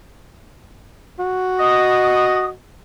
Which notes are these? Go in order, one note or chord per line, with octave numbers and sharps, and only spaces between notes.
F#4
D#5 D#6